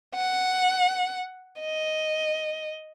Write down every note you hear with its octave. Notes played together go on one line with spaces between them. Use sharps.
F#5
D#5